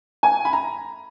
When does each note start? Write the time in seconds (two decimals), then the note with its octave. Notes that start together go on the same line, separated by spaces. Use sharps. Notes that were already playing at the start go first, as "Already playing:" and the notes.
0.23 G#5
0.45 B5
0.53 A#5